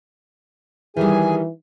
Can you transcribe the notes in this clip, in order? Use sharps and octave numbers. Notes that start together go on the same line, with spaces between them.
D#3 E3 G3 G#4 G#5